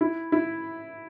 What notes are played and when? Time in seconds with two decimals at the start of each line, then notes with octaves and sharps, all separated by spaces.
0.01 E4
0.32 E4